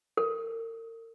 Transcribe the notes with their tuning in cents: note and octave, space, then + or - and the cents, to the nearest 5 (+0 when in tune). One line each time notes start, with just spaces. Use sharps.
A#4 -40